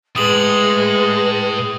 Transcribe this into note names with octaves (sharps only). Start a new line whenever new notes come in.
A2 G#3 B4 D#6 F7 F#7